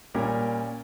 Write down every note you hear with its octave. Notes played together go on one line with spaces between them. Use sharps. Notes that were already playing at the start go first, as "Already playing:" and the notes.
A#2 G3 C#4 G4 A#4